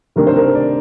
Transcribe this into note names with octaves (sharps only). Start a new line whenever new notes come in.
C3 D#3 A3 D4 A#4
C5
A#4
D5